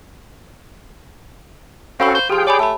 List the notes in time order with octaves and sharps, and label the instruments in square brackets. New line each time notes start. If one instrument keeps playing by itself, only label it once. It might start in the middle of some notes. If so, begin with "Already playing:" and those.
[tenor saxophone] C4 [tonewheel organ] C#4 F#4 A4 [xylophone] F5 B5 C#6
[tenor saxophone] C5
[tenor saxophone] F3 [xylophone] G4 C6 [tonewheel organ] G#4 G5
[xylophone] C#5 G#5 B5 [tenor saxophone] D5
[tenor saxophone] A3 [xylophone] A5 B5